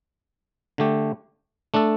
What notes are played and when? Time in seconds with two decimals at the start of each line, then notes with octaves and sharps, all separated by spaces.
0.78 D3 A3 G4
1.74 A3 D4 A4